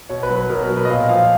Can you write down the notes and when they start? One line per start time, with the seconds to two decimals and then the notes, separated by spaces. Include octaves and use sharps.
0.09 B2 C#5
0.23 B4
0.29 F#3
0.36 B4
0.49 B2 A#4
0.64 A#4
0.70 F#3
0.77 B4
0.85 D#5
0.89 A#2 F5
1.09 F3 F5